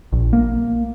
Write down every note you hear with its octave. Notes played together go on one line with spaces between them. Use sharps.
A#1
A#3